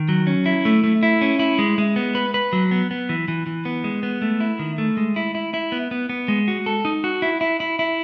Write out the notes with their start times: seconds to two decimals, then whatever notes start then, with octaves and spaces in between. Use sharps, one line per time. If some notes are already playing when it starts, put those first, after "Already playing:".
Already playing: D#3
0.09 F#3
0.27 C#4
0.46 E4
0.65 A3
0.84 A3
1.03 E4
1.21 C#4
1.39 E4
1.59 G#3
1.78 G#3
1.96 B3
2.15 B4
2.34 B4
2.53 F#3
2.71 B3
2.91 B3
3.09 E3
3.28 E3
3.47 E3
3.65 B3
3.84 G#3
4.03 B3
4.22 A3
4.40 E4
4.59 D#3
4.78 A3
4.97 G#3
5.16 E4
5.35 E4
5.54 E4
5.72 B3
5.91 B3
6.09 B3
6.28 G#3
6.48 F#4
6.66 A4
6.85 D#4
7.04 F#4
7.22 E4
7.41 E4
7.60 E4
7.79 E4